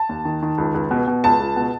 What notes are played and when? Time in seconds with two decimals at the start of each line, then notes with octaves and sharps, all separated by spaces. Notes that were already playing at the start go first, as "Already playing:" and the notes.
Already playing: A5
0.09 D#2
0.25 D#3
0.42 D#3
0.58 C#2
0.74 C#2
0.91 B2
1.07 B2
1.24 C#2 A5
1.40 C#2
1.56 B2